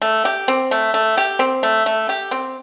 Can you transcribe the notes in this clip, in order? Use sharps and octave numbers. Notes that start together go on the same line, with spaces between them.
A3
G4
C4
A3
A3
G4
C4
A3
A3
G4
C4